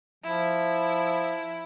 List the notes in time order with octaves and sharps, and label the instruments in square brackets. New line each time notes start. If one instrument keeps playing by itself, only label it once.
[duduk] F3 [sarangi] E4